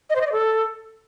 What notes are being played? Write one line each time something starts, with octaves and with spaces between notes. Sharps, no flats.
D#5
C5
D#5
D5
A4